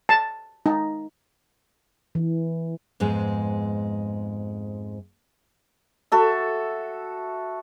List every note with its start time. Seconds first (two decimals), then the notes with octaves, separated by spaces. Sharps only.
0.09 A5
0.66 D#4
2.15 E3
3.00 F2 G#2 G#3 B3
6.12 F#4 A4 E5